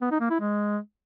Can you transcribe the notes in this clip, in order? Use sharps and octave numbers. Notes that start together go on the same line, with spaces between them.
B3
D#4
A#3
E4
G#3